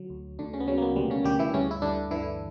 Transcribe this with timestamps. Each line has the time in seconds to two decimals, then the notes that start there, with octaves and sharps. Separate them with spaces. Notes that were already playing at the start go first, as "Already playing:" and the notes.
Already playing: D3 F#3
0.10 D2
0.39 D2 D3 D4
0.53 C#3 C#4
0.60 B3
0.68 C#3 F#3 C#4
0.78 A#3
0.81 B2 B3
0.96 D2 G3
1.10 C#3 C#4
1.24 D2 G3 G4
1.39 E3 E4
1.53 G2 C#3 C#4
1.71 E4
1.82 G2 D3 D4
2.11 D3 E3 E4